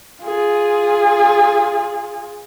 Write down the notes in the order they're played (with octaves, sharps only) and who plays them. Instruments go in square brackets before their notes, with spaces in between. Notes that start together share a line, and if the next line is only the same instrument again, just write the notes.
[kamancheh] F4 G#4